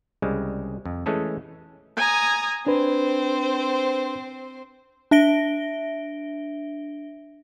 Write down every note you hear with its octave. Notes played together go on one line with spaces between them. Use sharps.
C2 C#3 G3 G#3
F2
E3 G#3 A3 C#4 G#4 A4
G#5 A#5 D#6
C4 D4 B4 C5
D4 E5 A#6 D7 G7